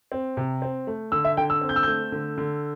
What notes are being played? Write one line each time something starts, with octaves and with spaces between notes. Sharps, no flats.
C4
C3
C4
A3
D3 E6
E5
D3 G5
E6
C4
G6
E6
A3 G6
D3
D3